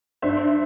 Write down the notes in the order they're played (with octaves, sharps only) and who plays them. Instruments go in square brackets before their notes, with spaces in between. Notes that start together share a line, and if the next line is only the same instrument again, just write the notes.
[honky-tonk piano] G2 C5 E5